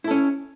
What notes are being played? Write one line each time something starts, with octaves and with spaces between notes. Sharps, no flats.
C#4 E4 A4